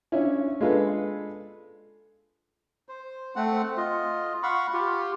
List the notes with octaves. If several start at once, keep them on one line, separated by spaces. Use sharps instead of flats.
C#4 D4 E4 F4 C#5
G#3 D4 F4 A4 B4
C5
A3 C4 F#5
F4 D#5
F5 F#5 B5 C#6
F4 G4